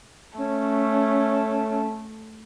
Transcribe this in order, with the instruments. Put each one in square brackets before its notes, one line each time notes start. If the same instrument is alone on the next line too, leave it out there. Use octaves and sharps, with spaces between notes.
[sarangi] A3 [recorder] C#4